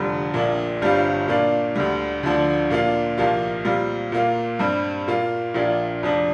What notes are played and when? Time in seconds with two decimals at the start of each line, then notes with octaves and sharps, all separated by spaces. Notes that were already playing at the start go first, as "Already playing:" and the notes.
Already playing: F1 F2 D3 G3
0.34 A#1 A#2 A#3 D4
0.81 G1 G2 G3 C4 F4
1.28 A#2 A#3 D4 F4
1.75 D2 D3 G3
2.23 D2 D3 F3 D4
2.70 A#2 A#3 D4 F4
3.18 C2 A#2 F3 A#3 F4
3.65 A#2 G3 C4 F4
4.12 A#2 A#3 F4
4.59 G2 G3 C4
5.07 A#2 A#3 F4
5.54 A#1 A#2 A#3 D4 F4
6.02 F1 F2 F3 D4